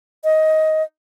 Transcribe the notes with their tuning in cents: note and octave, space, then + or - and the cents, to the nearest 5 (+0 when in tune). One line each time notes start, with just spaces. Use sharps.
D#5 +15